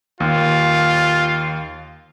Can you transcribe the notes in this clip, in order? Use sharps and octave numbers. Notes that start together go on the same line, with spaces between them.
D#2 F4